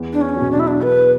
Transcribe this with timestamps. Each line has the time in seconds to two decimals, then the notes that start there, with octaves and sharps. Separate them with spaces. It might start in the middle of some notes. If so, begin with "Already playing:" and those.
Already playing: E2
0.13 D4
0.21 C#4
0.36 B2 F#3
0.51 D4
0.59 E4
0.67 D4
0.81 E2 B4